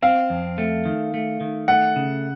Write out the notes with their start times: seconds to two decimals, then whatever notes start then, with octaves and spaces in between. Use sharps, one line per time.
0.02 C4 F5
0.30 F2
0.58 A3
0.85 D#3
1.14 A3
1.41 D#3
1.68 A3 F#5
1.96 C#3